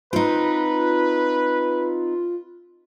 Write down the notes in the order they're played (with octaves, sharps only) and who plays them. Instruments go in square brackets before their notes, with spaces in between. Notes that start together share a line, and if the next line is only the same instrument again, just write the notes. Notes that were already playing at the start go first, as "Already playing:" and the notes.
[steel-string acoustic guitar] C4 D#4 [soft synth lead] F4 [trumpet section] B4